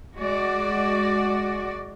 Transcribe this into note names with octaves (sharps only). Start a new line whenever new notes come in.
G#3 F#4 D5